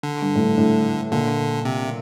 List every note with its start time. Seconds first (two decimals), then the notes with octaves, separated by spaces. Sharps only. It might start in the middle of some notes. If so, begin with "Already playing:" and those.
0.03 D3
0.22 G2
0.35 A2
0.40 G2
0.58 A2
1.11 A#2 D3
1.65 C3